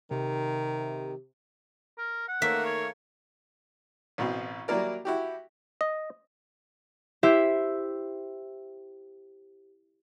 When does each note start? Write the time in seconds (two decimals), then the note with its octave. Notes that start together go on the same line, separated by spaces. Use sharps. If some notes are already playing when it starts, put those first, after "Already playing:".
0.11 C3 D#3
1.98 A#4
2.28 F#5
2.42 D#3 A3 A#3 E5
2.65 C#5
4.18 A1 B2 C4
4.68 F#3 G3 A#3 E4 A#4 D5
5.05 E4 F#4 G4
5.81 D#5
7.23 E4 G4 C5 E5